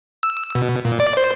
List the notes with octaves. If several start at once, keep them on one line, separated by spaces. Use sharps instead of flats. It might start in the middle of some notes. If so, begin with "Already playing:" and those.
E6
B2
A#2
D5
C5